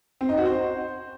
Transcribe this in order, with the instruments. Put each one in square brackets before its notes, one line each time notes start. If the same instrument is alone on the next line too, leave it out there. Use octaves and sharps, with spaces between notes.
[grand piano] C4
D#4
F#4
C5